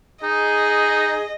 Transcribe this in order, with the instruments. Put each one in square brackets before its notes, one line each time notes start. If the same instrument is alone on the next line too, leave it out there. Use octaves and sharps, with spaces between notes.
[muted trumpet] D#4 [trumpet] G#4 [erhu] D#5